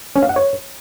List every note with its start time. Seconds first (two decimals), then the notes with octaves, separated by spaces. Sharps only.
0.16 C#4
0.22 F5
0.29 F#5
0.36 C#5